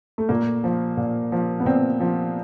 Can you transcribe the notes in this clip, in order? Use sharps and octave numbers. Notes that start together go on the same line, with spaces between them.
A3
A#2 A#3
F3
A#2
F3
B3
A#2 C4
F3